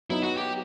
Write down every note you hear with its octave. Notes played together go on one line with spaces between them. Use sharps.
F#3 B3 D#4 E4
F#4
G4